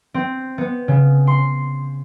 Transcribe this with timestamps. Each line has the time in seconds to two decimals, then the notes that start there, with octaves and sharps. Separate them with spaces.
0.14 C4
0.58 B3
0.88 C#3
1.27 C6